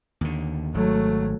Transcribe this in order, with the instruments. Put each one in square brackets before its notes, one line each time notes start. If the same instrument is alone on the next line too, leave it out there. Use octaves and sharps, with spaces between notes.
[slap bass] D#2 D3
[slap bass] G#1 [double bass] F#3 A3